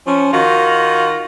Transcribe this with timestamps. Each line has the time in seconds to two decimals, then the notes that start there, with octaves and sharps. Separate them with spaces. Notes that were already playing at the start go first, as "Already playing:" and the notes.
0.06 F3 C#4
0.32 D#3 F4 F#4